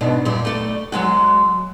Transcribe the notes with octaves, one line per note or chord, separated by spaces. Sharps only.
G#2 B2 D4
F#2 A#2 G3
A3 D5
F#3 G#3 F#4